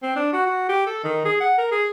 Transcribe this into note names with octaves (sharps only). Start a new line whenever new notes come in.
C4
D4
F#4
F#4
G4
A4
D#3
G#4
F#5
A#4
G#4